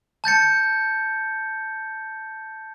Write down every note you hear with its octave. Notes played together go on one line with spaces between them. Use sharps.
A5 G6 A6 C#7